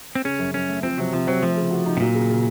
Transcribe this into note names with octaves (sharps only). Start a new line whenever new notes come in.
C4
C#3 C#4
F#2
F#2 C#4
A3
F3 C4
C3 F#3
C3 F3
F#3 C4
F3 A3
C#3
F#4
D#4
C3
A#2 F#3
C#3
C#3